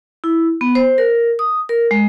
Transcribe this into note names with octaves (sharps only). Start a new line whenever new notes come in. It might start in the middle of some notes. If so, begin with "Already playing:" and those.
E4
B3
C5
A#4
D#6
A#4
G#3